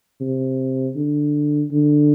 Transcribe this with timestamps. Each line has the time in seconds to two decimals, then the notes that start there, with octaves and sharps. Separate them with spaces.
0.21 C3
0.96 D3
1.72 D3